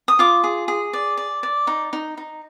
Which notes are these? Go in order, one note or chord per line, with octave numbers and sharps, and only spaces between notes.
D#6
F4 D6
G#4
G#4
D5
D5
D5
D#4
D#4
D#4